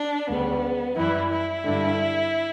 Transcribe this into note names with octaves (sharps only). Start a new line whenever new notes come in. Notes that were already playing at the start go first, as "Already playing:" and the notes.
Already playing: D4
D2 C#3 G3 B3
F#2 E3 G3 E4
E4
G2 D3 G3